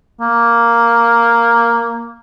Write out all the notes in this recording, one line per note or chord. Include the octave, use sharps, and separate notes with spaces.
A#3